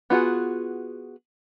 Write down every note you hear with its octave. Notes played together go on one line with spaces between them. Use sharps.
B3 F4 F#4 G#4